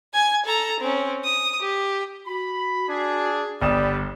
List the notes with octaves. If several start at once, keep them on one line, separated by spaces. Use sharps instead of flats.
G#5 G#6
A4 A#5
C4 C#4
D#6
G4
F#4 B5
D4 G#4
G1 G3 B3 B4 D5 D#6 E7